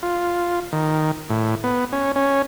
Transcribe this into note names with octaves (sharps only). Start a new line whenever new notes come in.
F4
D#3
A2
B3
C#4
C#4